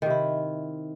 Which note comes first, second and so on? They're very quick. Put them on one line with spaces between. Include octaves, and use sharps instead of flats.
D#3 C3 E4